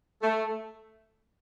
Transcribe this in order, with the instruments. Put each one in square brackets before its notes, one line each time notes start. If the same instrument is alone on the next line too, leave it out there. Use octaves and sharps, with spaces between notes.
[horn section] A3